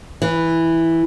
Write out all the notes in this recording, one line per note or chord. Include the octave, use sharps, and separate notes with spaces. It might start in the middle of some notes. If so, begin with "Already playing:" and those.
E3